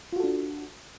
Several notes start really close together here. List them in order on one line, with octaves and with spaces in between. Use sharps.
F4 F#4 A4 D4